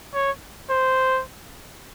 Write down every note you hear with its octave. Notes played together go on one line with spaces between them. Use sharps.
C#5
C5